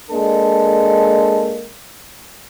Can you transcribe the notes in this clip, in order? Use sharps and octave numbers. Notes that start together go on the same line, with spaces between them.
G#3 A#3 D4 A4